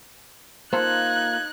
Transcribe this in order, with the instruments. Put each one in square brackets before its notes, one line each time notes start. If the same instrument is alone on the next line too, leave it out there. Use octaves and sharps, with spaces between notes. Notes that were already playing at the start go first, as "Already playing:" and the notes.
[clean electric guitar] A#3 F4 A4 [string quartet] D#4 F#6 [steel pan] C5 [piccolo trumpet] G#6